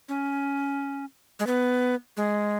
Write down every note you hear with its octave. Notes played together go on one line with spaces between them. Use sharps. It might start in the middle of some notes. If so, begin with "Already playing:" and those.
C#4
G#3
B3
G#3